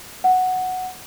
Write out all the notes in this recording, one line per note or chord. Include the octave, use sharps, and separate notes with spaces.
F#5